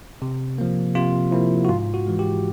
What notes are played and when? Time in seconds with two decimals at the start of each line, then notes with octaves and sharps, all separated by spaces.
0.22 C3
0.58 F3 A#3
0.95 C3 F4
1.32 F3 A#3 E4
1.65 F#4
1.69 G#2 F4
1.94 F#4
2.07 E3 G#3
2.19 G4